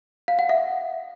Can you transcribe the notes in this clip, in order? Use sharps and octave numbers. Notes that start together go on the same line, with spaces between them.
F5
F#5
E5